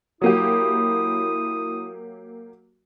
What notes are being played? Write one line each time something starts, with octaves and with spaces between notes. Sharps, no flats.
F#3 A#3 E4 G4 D#6